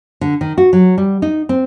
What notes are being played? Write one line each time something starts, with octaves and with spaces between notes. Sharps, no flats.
D3
D#3
F#4
F#3
G3
D#4
C4